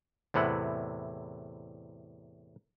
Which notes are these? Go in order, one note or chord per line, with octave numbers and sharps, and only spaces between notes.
E2 A2 C3 E4 F#5